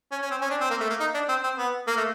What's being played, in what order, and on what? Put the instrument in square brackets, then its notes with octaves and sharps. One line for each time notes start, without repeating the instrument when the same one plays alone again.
[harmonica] C#4
C#4
C4
C#4
D4
C4
A#3
A3
A#3
D#4
D4
C4
C4
B3
A#3
A3